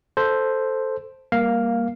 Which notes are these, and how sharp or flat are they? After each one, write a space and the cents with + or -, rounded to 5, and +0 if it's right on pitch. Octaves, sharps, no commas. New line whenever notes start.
A4 +0 C5 +0
G3 +35 A#3 +10 F5 +0